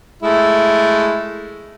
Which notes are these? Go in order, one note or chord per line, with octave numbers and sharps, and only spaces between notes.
G#3 A3 E4